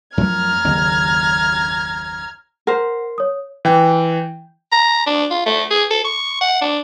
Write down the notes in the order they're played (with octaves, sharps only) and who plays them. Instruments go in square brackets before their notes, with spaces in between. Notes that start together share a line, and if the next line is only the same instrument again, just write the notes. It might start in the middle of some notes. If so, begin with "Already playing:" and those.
[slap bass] F#2 F3 A3 [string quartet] A#5 F6 G#6
[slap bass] F#1 D#2
[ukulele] A#4 C5 [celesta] F#5
[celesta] C#5 D#6
[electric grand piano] E3 G5
[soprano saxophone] A#5
D4
F4
A3
G#4
A4
C#6
F#5
D4